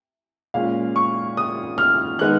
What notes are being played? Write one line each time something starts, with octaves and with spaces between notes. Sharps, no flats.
A#2 G#3 C#4 F5
C#6
D#6
F6
D#3 G#3 B3 D#4 F#6